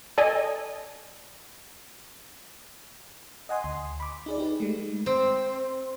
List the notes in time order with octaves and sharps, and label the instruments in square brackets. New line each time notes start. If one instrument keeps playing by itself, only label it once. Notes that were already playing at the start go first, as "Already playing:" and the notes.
[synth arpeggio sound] A4 D5 D#5 G#5
[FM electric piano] D#5 F#5 G#5 C6 D#6
D2 C6
B5 D6
D#4 G#4 D5
D#4 G4 B4
G#3 A3
[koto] C4